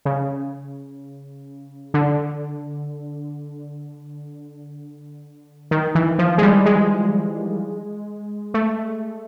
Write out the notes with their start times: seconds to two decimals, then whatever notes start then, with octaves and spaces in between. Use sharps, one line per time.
0.05 C#3
1.94 D3
5.71 D#3
5.95 E3
6.19 F3
6.38 G#3
6.42 G3
6.66 G#3
8.54 A3